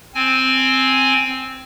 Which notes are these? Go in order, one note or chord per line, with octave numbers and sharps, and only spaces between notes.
C4 G#5